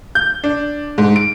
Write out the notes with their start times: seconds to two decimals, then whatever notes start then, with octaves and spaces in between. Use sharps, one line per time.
0.15 G6
0.44 D4
0.98 G#2
1.16 D7